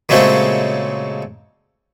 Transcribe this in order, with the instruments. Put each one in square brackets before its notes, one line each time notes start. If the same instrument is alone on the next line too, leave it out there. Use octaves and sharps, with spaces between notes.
[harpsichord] A#2 C#3 F#3 G#3 A3 C4